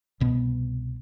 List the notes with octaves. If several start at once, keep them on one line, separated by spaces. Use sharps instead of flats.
C2 B2 B3